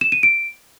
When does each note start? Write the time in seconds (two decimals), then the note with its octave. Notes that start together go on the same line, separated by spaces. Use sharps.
0.01 E7
0.12 D#7
0.23 D7